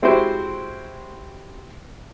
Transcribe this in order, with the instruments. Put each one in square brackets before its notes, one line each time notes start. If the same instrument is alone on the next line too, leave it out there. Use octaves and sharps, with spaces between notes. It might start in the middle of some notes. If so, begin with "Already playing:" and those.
[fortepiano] G#3 C4 E4 F#4 G4 C5